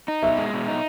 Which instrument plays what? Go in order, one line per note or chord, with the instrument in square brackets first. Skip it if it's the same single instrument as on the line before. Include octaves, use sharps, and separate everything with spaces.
[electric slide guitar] D#4
[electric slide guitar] B2 [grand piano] E5
[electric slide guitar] G#3
B2
D#4